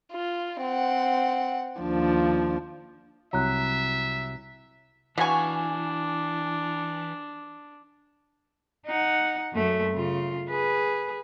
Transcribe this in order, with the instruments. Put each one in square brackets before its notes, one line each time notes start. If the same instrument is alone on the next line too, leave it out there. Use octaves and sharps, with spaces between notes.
[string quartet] F4
C4 F#5
D#2 F3 D4
[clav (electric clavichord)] C2 F#3 [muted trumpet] E5 [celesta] A#5 F#6
[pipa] B2 C#6 [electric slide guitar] E3 [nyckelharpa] D4 [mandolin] F5 G#5
[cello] D#4 F#5
F#2 A3
C#3 F4
G#4 B4